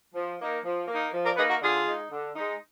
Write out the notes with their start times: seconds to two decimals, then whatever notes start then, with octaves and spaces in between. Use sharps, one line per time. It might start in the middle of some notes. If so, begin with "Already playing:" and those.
0.14 F3
0.40 A#3 D#4
0.65 F3
0.88 A#3
0.93 D#4
1.13 F3
1.25 A#4 D5
1.37 A#3 D#4 G#4 B4
1.49 F#4 A#4
1.61 D3 F4 G#4
1.86 G#3 D#4
2.11 D3
2.35 G#3 D#4